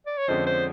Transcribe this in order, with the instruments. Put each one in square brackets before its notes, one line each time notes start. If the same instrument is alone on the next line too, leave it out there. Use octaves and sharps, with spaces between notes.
[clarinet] D5
C#5
[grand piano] F2 D3 F3 G#3 C#4 [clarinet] C5
[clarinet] C5